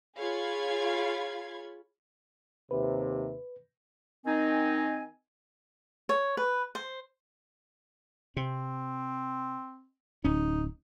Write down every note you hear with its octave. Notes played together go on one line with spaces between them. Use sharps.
F4 G#4 C#5 F5 B5 G#6
D#2 C3 B4
D#3 C4 D#4 G#5
C#5
B4
C5
C3 C4
D1 C#4 D#4